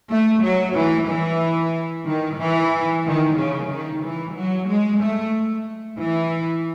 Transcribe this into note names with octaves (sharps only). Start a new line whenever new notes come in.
A3
F#3
E3
E3
D#3
E3
D#3
C#3
D#3
E3
F#3
G#3
A3
E3